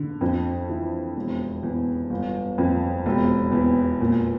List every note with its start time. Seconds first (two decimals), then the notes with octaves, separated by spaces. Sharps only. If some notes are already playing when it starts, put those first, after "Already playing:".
Already playing: D3
0.21 F2
0.69 E3
1.16 E1
1.63 E2
2.10 G1
2.58 F2
3.06 E1
3.52 E2
4.00 A#2